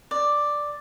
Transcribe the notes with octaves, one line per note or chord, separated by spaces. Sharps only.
D5